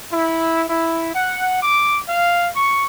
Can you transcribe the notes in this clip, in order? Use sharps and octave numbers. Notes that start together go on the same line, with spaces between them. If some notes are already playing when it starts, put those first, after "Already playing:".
E4
E4
F#5
D6
F5
C#6